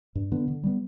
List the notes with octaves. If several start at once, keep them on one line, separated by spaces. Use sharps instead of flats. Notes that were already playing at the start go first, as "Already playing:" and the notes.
G2
D3 B3
D3
G3 B3